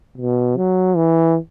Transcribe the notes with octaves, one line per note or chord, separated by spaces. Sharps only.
B2
F#3
E3